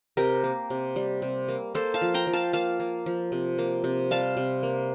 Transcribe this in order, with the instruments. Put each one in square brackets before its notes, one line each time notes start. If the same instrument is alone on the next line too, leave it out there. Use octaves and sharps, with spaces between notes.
[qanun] C3 G4 A#4
A#3
C3
G3
C3
A#3
A#3 A4 C5
F5 A5
F3
G5 A#5
F3
F5 A5
A#3 F5 A5
A#3
F3
C3
A#3
C3
G3 F5 A5
C3
A#3